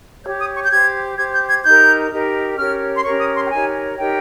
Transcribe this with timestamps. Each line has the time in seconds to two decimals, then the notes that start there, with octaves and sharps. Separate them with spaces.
0.24 G4 C#5 G6
0.40 D#6
0.55 C#6
0.65 G6
0.71 G4 C5 G#6
1.17 G4 C5 G#6
1.33 G6
1.49 G#6
1.64 D#4 G4 A#4 G6
2.12 D#4 G4 A#4
2.58 C#4 G4 A#4 C#5 F6
2.96 C6
3.05 C#4 G4 A#4 C#5 C#6
3.20 D#6
3.36 C6
3.46 G5
3.51 D#4 G4 A#4 C#5 G#5
3.98 D#4 G4 A#4 C#5 G5